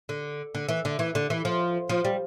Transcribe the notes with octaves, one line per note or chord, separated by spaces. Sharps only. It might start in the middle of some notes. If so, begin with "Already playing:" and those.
D3
D3
E3
D3
E3
D3
E3
F3
F3
G3